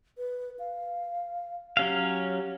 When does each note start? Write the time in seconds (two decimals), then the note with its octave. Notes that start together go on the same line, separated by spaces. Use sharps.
0.18 B4
0.59 F5
1.77 F#3 C#4 G4 F5